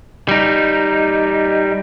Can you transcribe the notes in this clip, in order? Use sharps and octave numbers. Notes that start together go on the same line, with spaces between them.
G3 D#4